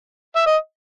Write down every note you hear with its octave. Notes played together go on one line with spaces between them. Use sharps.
E5
D#5